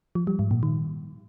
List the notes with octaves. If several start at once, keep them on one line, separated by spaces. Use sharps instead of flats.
F3
G3
G#2
A#2
D#3